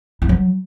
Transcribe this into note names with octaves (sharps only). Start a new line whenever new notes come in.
E3
F#3